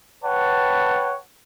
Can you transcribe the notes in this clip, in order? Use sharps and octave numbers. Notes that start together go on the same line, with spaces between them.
B4 C#5 F#5 G5 A5